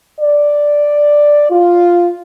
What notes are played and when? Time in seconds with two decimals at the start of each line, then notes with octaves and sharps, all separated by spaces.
0.20 D5
1.50 F4